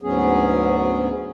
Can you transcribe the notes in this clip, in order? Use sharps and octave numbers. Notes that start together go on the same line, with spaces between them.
D2 G#2 F#3 B3 C#4 G#4